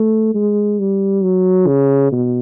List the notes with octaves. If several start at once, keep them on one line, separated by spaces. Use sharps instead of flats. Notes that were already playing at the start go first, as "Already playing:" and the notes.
Already playing: A3
G#3
G3
F#3
C#3
B2